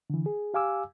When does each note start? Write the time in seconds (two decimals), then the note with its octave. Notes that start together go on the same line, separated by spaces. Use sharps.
0.10 D3 E3
0.26 G#4
0.54 G4 F5 G#5 D6 E6